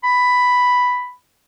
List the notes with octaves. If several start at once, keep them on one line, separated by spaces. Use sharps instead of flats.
B5